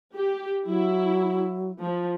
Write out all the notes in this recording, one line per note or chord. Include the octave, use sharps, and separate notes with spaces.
G4
F#3 E4
F3